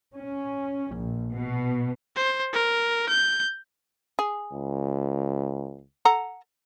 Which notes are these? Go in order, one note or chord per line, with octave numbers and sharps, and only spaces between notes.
C#4
A#1
B2
C5
A#4
G6
G#4
C#2
A4 F#5 A#5